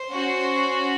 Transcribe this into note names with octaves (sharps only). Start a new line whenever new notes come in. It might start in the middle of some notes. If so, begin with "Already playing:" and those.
Already playing: C5
C#4 F#4